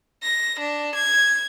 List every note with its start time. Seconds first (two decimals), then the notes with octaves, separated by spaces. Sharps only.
0.22 A#6
0.59 D4
0.95 G#6